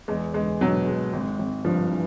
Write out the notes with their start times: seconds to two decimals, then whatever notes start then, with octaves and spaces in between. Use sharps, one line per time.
0.08 E2 G#3
0.34 E2 G#3
0.61 B2 F#3
0.86 G#3
1.13 G#1
1.39 G#1
1.65 G2 F3
1.91 E3